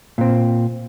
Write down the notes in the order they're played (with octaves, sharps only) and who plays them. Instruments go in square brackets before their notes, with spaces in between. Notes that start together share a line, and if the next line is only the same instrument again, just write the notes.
[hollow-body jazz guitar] A#2 C4